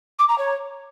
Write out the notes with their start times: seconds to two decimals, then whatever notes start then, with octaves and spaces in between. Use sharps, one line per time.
0.19 D6
0.28 A#5
0.38 C#5